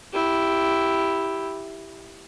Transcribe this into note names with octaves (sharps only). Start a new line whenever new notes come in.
E4 G4